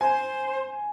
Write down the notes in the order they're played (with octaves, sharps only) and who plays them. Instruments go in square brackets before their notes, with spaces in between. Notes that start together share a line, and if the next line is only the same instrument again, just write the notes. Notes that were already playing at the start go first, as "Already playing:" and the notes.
[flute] C5 [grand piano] G#5